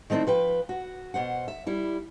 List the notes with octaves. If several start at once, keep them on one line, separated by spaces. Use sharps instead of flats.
D#3 A3 C4 D4 E4
F3 B4 G5
F#4
B2 E3 C5 F#5
E5
G3 E4